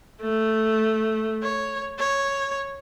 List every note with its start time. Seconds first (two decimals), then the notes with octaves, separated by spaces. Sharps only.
0.22 A3
1.43 C#5
1.99 C#5